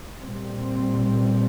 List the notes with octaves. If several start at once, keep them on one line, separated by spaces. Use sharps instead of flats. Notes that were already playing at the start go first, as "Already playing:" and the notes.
A#2 G3 C4